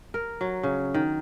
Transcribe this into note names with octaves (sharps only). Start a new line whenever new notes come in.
A#4
F#3
C#3
D#3